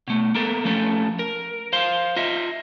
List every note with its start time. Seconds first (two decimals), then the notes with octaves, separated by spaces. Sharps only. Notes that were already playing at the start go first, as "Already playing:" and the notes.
0.08 B2 A3
0.35 A#3 B3 A4 A#4
0.65 F3 A3 C#4 A4
1.19 A#4
1.73 C5 F5 C6
2.16 F4 D#5 E5